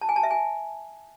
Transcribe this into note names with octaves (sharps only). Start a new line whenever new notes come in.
A5
G#5
A5
E5
G#5